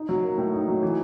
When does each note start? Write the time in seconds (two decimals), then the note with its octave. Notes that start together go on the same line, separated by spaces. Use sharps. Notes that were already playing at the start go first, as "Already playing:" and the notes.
Already playing: D#4
0.09 F#3
0.24 A#3
0.38 A2
0.54 D#4
0.68 F#3
0.83 E3